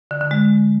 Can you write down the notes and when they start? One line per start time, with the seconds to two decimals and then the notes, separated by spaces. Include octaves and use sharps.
0.11 D3
0.21 D3
0.31 G#3